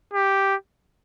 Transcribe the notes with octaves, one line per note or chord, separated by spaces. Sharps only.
G4